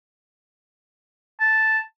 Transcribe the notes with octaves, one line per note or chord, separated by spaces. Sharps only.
A5